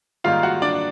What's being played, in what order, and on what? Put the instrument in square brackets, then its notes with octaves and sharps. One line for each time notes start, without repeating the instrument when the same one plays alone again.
[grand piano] G#2 D#3 G3 A#3 D#4 F4 F5
F#4 F#5
D4 D5